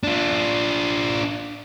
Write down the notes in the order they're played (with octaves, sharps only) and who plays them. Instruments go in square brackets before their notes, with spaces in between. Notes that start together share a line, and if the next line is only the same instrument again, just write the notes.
[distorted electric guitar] D4 F4